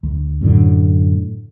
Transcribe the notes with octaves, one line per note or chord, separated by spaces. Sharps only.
D2
F#2 A2 D3